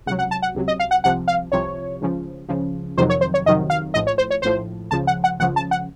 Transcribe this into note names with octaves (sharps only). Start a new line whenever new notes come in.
C#2 C3 F#3 F#5
F#5
A5
F#5
C#2 C3 F#3
D#5
F5
F#5
C2 C3 F3 F#5
F5
C2 C3 F3 C#5
C#2 C#3 F3
C#2 C#3 F3
F2 C3 D#3 F#3 C5
C#5
C5
C#5
F2 C3 D#3 F#3 D#5
F5
A#1 A2 F3 D#5
C#5
C5
C#5
A#1 A2 F3 C5
C#2 C#3 F3 A5
F#5
F#5
C#2 C#3 F3 F#5
A5
F#5